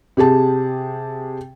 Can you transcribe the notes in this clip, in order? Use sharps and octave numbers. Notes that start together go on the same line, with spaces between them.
C3 G4 G#4 A5